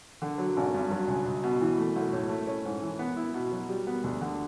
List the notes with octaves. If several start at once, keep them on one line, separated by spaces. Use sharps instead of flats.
D3
F#3
G#1
G2
F#3
C#2
C#2
B2
E3
A3
B1
A2
A3
C#4
G#2
E3
B3
E4
B2
F#3
G3
B3
D2
D3